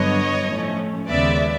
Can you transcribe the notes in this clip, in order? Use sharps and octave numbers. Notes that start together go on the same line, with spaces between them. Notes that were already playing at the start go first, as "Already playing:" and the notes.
Already playing: G2 D3 F#3 B3 D4 C#5 D#5
A2 F3 A3 C#4
D#2 C#3 F3 G#3 B3 D5 E5